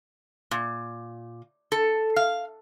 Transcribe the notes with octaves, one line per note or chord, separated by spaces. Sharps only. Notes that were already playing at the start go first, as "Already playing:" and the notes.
A#2
A4
F5